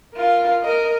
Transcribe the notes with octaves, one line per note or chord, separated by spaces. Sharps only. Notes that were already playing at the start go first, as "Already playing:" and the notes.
F4 A#4
A#4 D#5